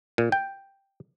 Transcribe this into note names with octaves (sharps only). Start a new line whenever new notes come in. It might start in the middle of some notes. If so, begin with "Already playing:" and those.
A#2
G5